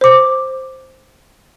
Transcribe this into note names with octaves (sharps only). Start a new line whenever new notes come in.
C5 D6